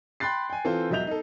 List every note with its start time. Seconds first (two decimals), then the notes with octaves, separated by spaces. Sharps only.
0.20 G5 B5 C6 F#6 A6 C7
0.50 G5 G#5
0.65 E3 C4 F4 A4 C5
0.91 E1 F#3 D#5 E5 G6 F7
1.07 D#4 A4